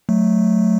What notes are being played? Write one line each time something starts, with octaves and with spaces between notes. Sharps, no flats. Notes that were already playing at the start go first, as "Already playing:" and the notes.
F#3 A3